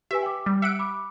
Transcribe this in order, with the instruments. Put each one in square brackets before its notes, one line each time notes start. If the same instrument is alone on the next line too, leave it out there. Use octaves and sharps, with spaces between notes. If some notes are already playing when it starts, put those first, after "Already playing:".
[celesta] G4 B4 G#5 [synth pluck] E5
[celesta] G5 D6
[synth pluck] G3
[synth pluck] E5 F#5 D7 [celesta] C#7
[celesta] B5 D6